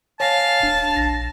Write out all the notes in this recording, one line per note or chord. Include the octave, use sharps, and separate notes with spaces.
C#5 F5 G#5 A5 A#6
D#1 D4
A#1 A#6